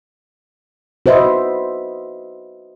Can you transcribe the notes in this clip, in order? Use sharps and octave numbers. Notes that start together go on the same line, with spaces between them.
F#4 B4 C5 D#5 E5